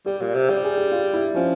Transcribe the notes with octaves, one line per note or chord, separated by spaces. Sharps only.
G3 G4
A#2
C3
G3 G4
G#4
G4
F4
E4
F3 C#4